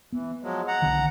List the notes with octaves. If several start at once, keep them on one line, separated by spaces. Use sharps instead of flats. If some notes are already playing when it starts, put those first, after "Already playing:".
E3 B3
F3 F#3 G#3
F#5 A#5
B1 D3 D#3